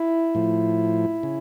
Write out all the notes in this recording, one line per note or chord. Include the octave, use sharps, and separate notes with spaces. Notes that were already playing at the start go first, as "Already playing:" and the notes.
Already playing: E4
A2 F3
C#3